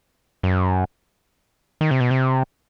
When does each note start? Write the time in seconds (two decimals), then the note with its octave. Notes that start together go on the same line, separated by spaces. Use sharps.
0.43 F#2
1.81 D#3
1.91 C3
2.00 B2
2.11 C3